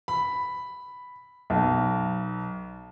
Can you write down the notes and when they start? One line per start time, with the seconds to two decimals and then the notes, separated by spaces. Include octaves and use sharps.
0.08 B5
1.50 B1